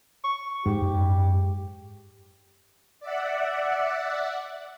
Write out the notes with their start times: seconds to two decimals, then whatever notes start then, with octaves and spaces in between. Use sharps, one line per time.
0.24 C#6
0.66 F2 G#2 G4
0.82 F#2
3.00 D5 E5 F#5